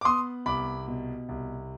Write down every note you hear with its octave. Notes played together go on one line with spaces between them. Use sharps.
D6
B3 C6 D#6
C2 B5 D6
B2
C2